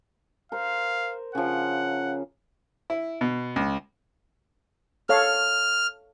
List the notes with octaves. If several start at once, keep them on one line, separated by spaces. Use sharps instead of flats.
A#4 C5 F5
C#3 F3 F#5
E4
B2
C#2
A4 C#5 F5 F6